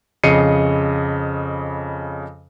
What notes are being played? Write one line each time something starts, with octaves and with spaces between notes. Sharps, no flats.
F2 C#3 D#5 C7 C#7 D#7